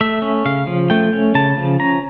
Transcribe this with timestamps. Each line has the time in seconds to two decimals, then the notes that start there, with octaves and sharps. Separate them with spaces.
0.01 A3 E5
0.22 C#4
0.45 C#3 F5
0.67 F3
0.90 A3 G5
1.13 C#4
1.35 C#3 A5
1.57 F3
1.80 C#4 A#5